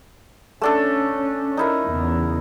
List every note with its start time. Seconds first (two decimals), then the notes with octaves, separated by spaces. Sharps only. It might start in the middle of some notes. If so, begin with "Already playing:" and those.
0.61 A3 C#4 D4 A4
1.57 D#4 E4 A#4
1.88 E2 C#3